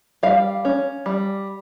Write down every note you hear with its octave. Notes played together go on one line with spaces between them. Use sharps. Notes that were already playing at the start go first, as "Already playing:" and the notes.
G3 F5
C#4
G3